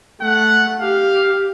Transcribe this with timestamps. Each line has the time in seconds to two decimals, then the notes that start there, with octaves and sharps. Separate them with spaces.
0.21 A3 F#5
0.80 G4 F5